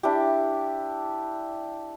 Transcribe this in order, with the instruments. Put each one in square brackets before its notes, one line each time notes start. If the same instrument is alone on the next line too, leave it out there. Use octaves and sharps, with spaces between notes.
[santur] D4 E4 G4